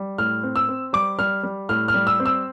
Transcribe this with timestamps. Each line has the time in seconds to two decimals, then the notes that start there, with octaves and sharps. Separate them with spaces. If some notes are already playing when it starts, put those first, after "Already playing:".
Already playing: G3
0.18 A2 F6
0.43 C4
0.56 E6
0.68 C4
0.93 G3 D6
1.19 G3 F6
1.43 G3
1.69 A2 F6
1.88 F6
1.94 G3
2.07 E6
2.20 C4
2.26 E6